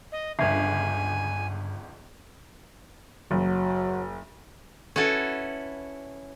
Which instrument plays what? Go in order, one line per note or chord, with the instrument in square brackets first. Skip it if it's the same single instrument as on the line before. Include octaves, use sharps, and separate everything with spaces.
[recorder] D#5
[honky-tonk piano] G1 C#2 [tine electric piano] G2 G#6 C7 [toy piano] B4 E5 [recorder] G#5
[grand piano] F#1 [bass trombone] F#3
[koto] C#4 E4 F#4 A4 B4